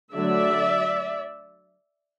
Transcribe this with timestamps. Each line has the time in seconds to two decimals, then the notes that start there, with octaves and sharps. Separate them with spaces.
0.14 D3 F#3 A3 D5 E5